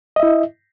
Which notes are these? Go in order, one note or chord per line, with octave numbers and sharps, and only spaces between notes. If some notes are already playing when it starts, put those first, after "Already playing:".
E4 D#5 E5